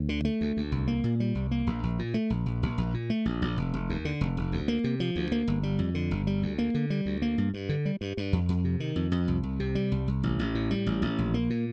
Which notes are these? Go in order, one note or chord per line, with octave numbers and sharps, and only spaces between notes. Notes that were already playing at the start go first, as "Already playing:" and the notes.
Already playing: D2
D3
A3
D2
D2
C2
A#3
A#2
G3
C2
A#3
A#1
A#1
A#2
A3
A#1
A#1
A#1
A#1
A#2
A3
A#1
A#1
F1
F1
D#2
D3
F1
F1
D2
A#3
C3
F3
D2
A#3
G1
G3
F2
D3
G1
G3
D2
A#3
D3
G3
D2
A#3
G2
G2
D3
G3
G2
G2
F2
F2
C3
D#3
F2
F2
C2
C2
C3
G3
C2
C2
A1
A1
A2
G3
A1
A1
A#1
A#3
A#2